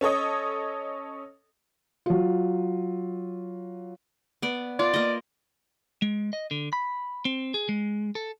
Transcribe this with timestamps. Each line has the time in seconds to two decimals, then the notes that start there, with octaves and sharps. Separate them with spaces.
0.01 C#4 A4 C#5 D#5
2.06 F#3 F4
4.42 B3 D5
4.79 F4 D5
4.94 A#3 D#5
6.02 G#3
6.33 D#5
6.51 D3
6.73 B5
7.25 C4
7.54 G#4
7.69 G#3
8.15 A4